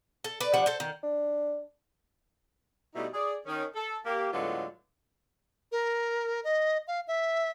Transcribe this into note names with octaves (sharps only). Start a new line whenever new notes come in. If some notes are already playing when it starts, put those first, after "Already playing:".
A4
B4 D5
F3 G3 D4 F#5
A4 C5
D#3
D4
B2 G3 A3 D#4 E4
G#4 D5
D#3 C#4
A4
A#3 G4
A2 D3 F#3 G#3 B3 F4
A#4
D#5
F5
E5